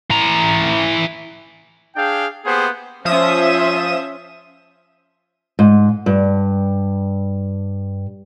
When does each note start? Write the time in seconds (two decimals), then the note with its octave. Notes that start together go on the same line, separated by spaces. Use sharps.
0.11 E3 A#5
1.96 D4 G#4 F5 G5
2.45 A#3 B3 G4 G#4 C5
3.05 F3 C#4 C5 E5 D#6 E7
5.59 G#2
6.06 G2